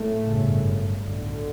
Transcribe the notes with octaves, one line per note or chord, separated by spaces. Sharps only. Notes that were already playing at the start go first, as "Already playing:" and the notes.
Already playing: A2 A3
G1 F#2 C#3
B1 A2 D3